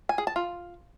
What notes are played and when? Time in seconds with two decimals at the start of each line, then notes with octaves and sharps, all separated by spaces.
0.09 G#5
0.18 G#4
0.27 A5
0.36 F4